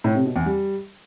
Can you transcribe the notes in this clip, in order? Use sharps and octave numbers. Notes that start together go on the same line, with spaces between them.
A2
C3
B2
E2
G3